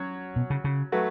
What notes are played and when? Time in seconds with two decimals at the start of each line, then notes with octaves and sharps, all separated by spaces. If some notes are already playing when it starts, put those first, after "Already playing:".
Already playing: F#3 C#4 F#4 C#5
0.36 B2
0.50 C#3
0.64 C#3
0.92 F#3 A3 F#4 B4